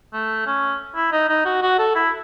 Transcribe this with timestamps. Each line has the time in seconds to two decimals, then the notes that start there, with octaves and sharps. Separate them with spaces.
0.13 A3
0.46 C#4
0.96 E4
1.12 D#4
1.29 D#4
1.45 F#4
1.62 F#4
1.79 A4
1.95 E4